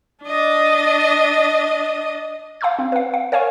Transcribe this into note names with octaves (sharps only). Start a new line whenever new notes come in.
D4 D#5
F5 A5 C6 E6 G6
C4
B4 F5
F5
A#4 C#5 F5 G#5 C#6